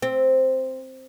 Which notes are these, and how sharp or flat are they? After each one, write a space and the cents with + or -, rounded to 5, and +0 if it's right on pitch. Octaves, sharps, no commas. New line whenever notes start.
C4 +0